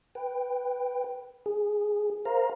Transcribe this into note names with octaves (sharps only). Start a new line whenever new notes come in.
B4 G5
G#4
A#4 C5 F5 A#5